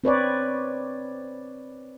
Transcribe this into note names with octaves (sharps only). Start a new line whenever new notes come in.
C4 B4 C#5 D5